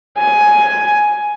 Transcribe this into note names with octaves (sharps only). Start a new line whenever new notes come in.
G#5